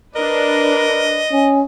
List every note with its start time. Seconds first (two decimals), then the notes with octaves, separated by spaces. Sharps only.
0.16 D4 A#4 B4 D#5
1.32 C#4